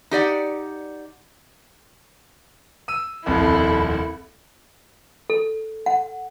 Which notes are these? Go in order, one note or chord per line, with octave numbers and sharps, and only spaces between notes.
D#4 G4 D5 F#5
E6 D#7
D#1 C2 F2 E4 A4
A4
F#5